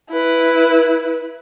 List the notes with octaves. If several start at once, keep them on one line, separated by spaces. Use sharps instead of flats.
E4 B4